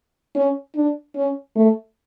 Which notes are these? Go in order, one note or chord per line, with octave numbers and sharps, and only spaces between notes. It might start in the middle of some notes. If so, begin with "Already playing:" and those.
C#4
D4
C#4
A3